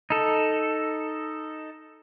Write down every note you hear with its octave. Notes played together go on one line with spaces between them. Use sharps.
D#4 A4